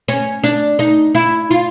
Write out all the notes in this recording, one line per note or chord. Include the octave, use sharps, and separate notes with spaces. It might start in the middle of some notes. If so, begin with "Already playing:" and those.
C#4
D4
D#4
E4
F4